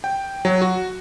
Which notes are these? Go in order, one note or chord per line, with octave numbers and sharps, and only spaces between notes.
G5
F#3
F#4